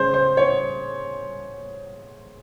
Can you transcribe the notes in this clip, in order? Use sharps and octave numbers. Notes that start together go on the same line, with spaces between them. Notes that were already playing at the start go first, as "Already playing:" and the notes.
Already playing: C#3 G#3 C#4 C5
C5
C#5